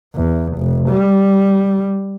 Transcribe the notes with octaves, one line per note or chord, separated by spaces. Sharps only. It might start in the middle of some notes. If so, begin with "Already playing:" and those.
E2
F1
G3